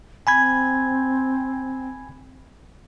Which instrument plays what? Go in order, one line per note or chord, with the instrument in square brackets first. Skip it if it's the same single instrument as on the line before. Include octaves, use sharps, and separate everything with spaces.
[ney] C4 [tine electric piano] G#5 B5 G#6